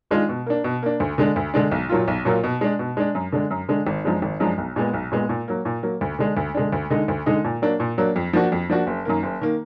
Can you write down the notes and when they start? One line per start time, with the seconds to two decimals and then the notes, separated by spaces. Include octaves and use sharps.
0.11 D#3 G#3 D4 F4
0.29 B2
0.46 A#3 D4
0.64 B2
0.83 A#3 D4
1.00 D2
1.18 D3 G#3 D4
1.36 D2
1.54 D3 G#3 D4
1.72 B1
1.89 A#2 F#3 A#3 F4
2.08 B1
2.25 A#2 F#3 A#3 F4
2.44 B2
2.61 G#3 D4
2.79 B2
2.97 G#3 D4
3.15 F#2
3.32 D3 G#3 D4
3.50 F#2
3.69 D3 G#3 D4
3.87 G#1
4.04 F#2 F3 G#3 D4
4.22 G#1
4.40 F#2 F3 G#3 D4
4.58 B1
4.76 A#2 G#3 B3
4.94 B1
5.12 A#2 G#3 B3
5.29 A#2
5.48 F#3 A#3
5.65 A#2
5.83 F#3 A#3
6.01 D2
6.19 D3 G#3 D4
6.37 D2
6.55 D3 G#3 D4
6.73 D2
6.90 D3 G#3 D#4
7.08 D2
7.26 D3 G#3 D#4
7.44 A#2
7.62 F#3 A#3 D4
7.80 A#2
7.98 F#3 A#3 D4
8.16 F2
8.33 F3 A#3 D4 F#4
8.52 F2
8.70 F3 A#3 D4 F#4
8.87 F#1
9.05 F#2 D#3 A#3
9.23 F#1
9.41 D#3 A#3